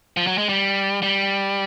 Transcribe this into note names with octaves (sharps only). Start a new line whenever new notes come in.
F3
F#3
G#3
G3
G3